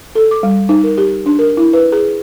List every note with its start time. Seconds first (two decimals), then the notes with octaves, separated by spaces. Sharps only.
0.15 A4
0.31 D6
0.43 G3
0.69 D#4
0.84 A#4
0.98 G4
1.26 D4
1.39 A#4
1.57 E4
1.73 B4
1.92 G#4